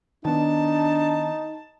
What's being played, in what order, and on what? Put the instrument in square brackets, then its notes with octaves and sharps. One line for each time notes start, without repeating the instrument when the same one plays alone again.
[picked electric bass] D#3 B3 [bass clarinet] D4 [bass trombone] D#4 [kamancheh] A5